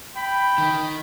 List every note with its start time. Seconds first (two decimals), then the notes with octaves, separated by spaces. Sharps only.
0.17 G5 B5
0.58 D#3